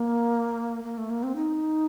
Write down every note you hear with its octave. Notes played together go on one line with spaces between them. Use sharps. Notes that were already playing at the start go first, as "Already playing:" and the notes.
Already playing: A#3
A#3
A3
A#3
C4
D#4